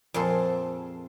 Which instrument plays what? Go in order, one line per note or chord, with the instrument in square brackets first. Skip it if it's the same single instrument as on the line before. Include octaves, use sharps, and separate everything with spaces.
[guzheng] F2 A#2 G#4 A4 C6